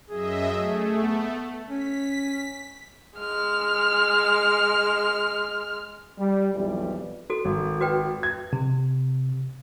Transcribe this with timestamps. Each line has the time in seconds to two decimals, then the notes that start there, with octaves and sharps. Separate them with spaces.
0.10 F#2 G#4 D#5 E5
0.54 A3
1.03 B3
1.69 C#4 B6
3.18 G#3 F6
6.18 G3
6.55 B1 F2 E3 G3
7.30 F#4 A4
7.45 G#1
7.81 F#4 B4 G5
8.23 G#6
8.53 C3